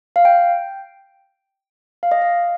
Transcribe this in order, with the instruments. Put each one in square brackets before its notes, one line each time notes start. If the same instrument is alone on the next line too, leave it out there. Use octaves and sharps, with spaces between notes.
[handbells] F5
G5
F5
D#5
F5